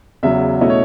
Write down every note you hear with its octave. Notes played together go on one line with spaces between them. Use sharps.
E2 C#3 F#3 E5
B2 A3 C#4 E4 D#5
C#5